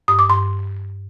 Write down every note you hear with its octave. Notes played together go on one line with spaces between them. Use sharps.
G2 D#6
D6
G2 C6